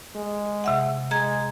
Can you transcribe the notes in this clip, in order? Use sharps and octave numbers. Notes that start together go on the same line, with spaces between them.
G#3
C3 E5 F#5
G#3 A#5 G#6